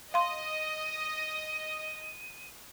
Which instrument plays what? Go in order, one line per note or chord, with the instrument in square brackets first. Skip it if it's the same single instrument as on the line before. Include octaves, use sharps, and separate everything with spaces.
[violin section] D#5 [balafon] F5 C6 [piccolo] D#7